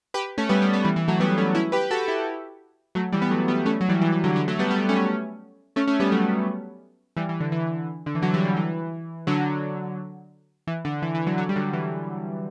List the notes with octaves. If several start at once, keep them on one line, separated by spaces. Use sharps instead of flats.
G4 B4
A3 C#4
G3 B3
G3 B3
G3 B3
E3 G3
E3
F#3 A3
G3 B3
A3 C#4
C#4 E4
G4 B4
F#4 A4
E4 G4
F#3 A3
E3 G3
B3
F#3 A3
G3 B3
A3 C#4
F#3
E3 G3
E3
E3
D3 F#3
D3 F#3
F#3 A3
G3 B3
G3 B3
A3 C#4
A3 C#4
A3 C#4
G3 B3
F#3 A3
E3 G3
E3
D3
E3
D3
E3
D3 F#3
E3 G3
D3
E3
D3 F#3
E3
D3
E3
E3
D3 F#3
D3 F#3
G3
D3 F#3
E3